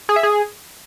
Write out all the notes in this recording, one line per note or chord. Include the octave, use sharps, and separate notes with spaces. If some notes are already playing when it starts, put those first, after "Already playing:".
G#4
E5
G#4